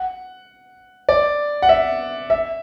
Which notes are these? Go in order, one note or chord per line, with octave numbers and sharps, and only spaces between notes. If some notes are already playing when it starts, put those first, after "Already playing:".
Already playing: F#5
D5
F#5
E5
E5